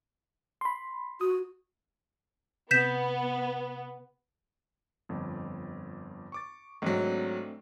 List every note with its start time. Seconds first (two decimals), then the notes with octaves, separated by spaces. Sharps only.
0.61 B5 C6
1.21 F#4 D#6
2.71 C3 B3 G6 B6 E7
5.09 G1 F2
6.32 C#6 D6 A6
6.82 G#1 F#3 A3 C4 D4